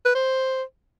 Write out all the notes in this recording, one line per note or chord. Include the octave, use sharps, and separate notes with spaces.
B4
C5